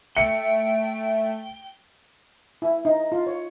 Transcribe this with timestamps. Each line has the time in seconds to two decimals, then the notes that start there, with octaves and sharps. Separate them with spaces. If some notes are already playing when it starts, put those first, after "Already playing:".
0.17 A3 E5 G5 C#7
2.62 E4
2.85 D#4
3.12 F4
3.27 C#5